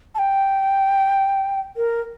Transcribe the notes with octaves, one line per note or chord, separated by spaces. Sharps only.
A5
G5
A#4